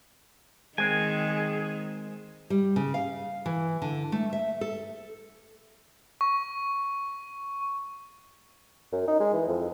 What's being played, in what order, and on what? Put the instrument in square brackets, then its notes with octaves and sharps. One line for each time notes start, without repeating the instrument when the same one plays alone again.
[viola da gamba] D#3 [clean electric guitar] G#3 C4 [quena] G#4 [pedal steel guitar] G#5
[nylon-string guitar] G3
C#3
F5
E3
D3
A3
E5
A4
[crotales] C#6
[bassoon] F#2
D#4
G#3
E3
F2